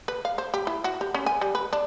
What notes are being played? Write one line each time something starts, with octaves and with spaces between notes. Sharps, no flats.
B4
F5
C5
G4
E4
F#4
G4
C#4
G#5
G3
B4
D4